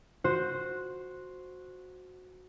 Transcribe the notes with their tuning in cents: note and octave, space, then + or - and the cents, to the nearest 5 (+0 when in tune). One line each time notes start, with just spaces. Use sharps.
F#4 -10 C5 +0